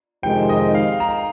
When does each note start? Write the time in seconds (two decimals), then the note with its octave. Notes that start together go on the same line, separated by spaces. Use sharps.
0.23 F2 C3 D#3 G#3 D#4 G5
0.49 D#5
0.75 F5
1.00 A#5